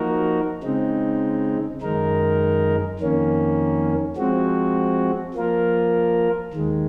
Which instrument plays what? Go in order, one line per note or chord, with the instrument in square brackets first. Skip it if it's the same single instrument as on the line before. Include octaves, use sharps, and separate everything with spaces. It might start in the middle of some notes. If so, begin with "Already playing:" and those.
Already playing: [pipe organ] F3 A#3 D#4 F#4 A#4
C#3 G#3 C4 D#4
F#2 D#3 G#3 D#4 A#4
F2 D#3 A#3 C#4
F3 G#3 C4 F#4
F3 A#3 F4 A#4
D#2 D#3 G#3